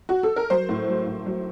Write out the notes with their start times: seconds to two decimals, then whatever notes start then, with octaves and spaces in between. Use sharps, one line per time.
0.09 F#4
0.23 A4
0.36 A#4
0.50 F#3 C5
0.69 A2
0.88 F#3
1.07 A2
1.26 F#3